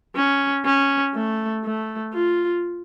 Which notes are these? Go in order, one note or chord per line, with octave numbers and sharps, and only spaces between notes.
C#4
C#4
A3
A3
F4